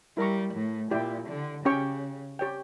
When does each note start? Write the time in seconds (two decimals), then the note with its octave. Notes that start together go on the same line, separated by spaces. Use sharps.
0.17 G3 E4 A#4 E5 A#5 C#6
0.54 A2
0.91 A#2 E4 G4 D5 G5
1.29 D3
1.65 C#3 C#4 G4 C#5 G5 C#6
2.39 G4 C#5 G5